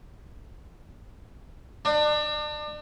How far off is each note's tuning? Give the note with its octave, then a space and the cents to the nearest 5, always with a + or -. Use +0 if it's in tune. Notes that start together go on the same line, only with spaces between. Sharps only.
D4 +35